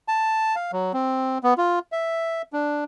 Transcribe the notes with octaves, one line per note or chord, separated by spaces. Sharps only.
A5
F5
F#3
C4
B3
F4
E5
D4